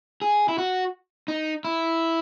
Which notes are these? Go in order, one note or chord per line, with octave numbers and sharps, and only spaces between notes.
G#4
E4
F#4
D#4
E4